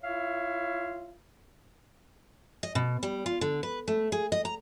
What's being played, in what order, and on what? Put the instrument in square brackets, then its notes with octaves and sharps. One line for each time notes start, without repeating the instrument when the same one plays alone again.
[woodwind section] E4 F4 C#5 E5 F5
[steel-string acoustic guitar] D#5
B2
G3
F4
D3
B4
A3
G#4
D#5
A#5